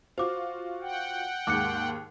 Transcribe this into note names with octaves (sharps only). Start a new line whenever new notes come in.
F4 F#4 C5 D6
F#5 G5
D#2 G#2 D6 F#6 C#7